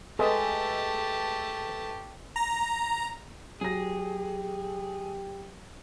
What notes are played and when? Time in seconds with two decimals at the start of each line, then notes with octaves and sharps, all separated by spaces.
0.19 G#3 A3 G4 A4 B4 D#5 A5
2.36 A#5
3.61 F#3 G4 G#4 A#6